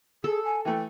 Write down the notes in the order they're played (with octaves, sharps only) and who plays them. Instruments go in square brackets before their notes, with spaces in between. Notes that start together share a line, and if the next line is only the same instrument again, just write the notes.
[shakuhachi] G#4 [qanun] A4
[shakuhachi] G#5
[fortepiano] E3 A3 [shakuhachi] G5